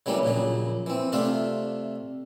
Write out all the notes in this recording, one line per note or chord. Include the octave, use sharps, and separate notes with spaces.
C#3 E3 F#3 G3 A#3 D4
A#1 A#2 C#3 F#3
E3 C4
C3 A3 D4 F4 E5 F5